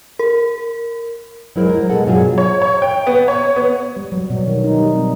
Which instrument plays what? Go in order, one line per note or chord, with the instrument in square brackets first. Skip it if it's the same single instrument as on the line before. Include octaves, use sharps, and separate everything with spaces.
[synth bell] A#4
[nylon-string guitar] F#3 G#3 E4 G#4 A#4 C5
A#4
B2 G#3 G#4 A4 F#5
G2 B2 F#3 F4 G#4
[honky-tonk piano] C#5
C#5
G5
B3
C#5
B3
[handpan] G3
F#3
B2
D#3
D#4
G3
C4